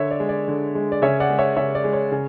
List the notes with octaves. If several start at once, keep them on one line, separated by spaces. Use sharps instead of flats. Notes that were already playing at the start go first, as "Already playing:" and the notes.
Already playing: D3 C#5 E5
D5
G#3
D5
D3
G#3
D5
C#3 C#5 E5
D5 F#5
G#3
C#5 E5
C#3 C#5 E5
D5
G#3
C#5
C#3